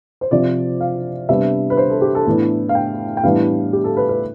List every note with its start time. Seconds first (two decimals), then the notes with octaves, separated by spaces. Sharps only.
0.21 C5
0.31 C3 F3 C4 D5
0.81 F5
1.29 C3 G3 B3 D4 E5
1.70 B4
1.77 C5
1.90 A4
2.01 G4
2.15 A4
2.27 A2 E3 B3 D4
2.69 F5
2.75 G5
3.17 G5
3.24 A2 E3 G3 B3 D4 F5
3.73 G4
3.84 A4
3.97 B4
4.09 B4